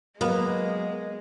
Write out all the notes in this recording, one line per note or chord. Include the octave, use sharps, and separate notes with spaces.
F#3 G#3 A#3 B3